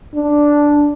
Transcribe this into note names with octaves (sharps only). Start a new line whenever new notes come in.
D4